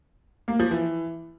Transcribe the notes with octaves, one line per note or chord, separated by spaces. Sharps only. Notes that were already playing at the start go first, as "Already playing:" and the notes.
A#3
F3
E3